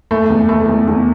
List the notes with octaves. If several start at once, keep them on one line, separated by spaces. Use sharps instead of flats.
A3
E2
A3
E2
E2